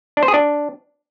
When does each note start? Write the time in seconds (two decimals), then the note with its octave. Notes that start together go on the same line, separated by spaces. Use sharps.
0.17 D4
0.23 C5
0.28 G#4
0.34 D4